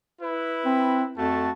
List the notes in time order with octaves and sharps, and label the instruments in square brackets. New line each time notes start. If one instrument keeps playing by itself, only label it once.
[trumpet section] E4 B4
[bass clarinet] C4
[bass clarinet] F2 [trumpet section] A3 F#4 A5